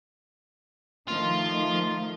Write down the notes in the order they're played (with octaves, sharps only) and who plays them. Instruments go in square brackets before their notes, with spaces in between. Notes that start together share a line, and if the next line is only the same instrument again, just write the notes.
[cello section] D#3 F3 A3 [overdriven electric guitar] F4